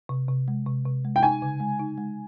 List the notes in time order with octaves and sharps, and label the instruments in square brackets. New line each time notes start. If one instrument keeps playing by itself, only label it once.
[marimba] C3
C3
G#3
C3
C3
G#3
[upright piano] G5
[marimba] D#4 [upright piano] G#5
[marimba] C#3
G#3
D#4
G#3